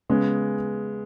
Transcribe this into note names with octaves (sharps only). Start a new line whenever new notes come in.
C#3 G#3 B3